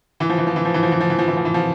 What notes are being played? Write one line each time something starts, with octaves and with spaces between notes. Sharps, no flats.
E3
F3
E3
F3
E3
F3
E3
F3
E3
F3
E3
F3
E3
F3
E3
F3